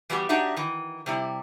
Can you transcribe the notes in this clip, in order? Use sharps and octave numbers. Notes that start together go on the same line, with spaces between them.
E3 G3 B3 F#4 G4
D4 D#4 F#4 G4 E5
D#3 E3
C3 G3 E4